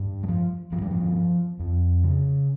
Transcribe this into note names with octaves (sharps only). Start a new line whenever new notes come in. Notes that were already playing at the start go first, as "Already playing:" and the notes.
Already playing: G2
G3
F3
G2 F3
G3
F3
F2
C#3